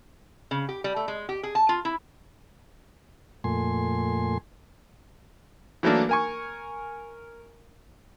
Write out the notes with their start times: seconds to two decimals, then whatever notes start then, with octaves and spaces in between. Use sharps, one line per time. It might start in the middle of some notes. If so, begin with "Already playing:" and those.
0.51 C#3
0.69 G4
0.84 G3
0.96 A3
1.08 G#3
1.29 G4
1.43 G#4
1.55 A5
1.69 F4
1.85 E4
3.44 F2 A#2 A3 G#5 C6
5.83 E3 F#3 A3 A#3 D4
6.09 A#4 G#5 C#6